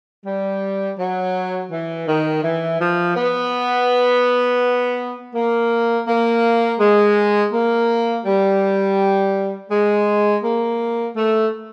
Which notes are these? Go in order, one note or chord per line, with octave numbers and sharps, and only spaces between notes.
G3
F#3
E3
D#3
E3
F3
B3
A#3
A#3
G#3
A#3
G3
G#3
A#3
A3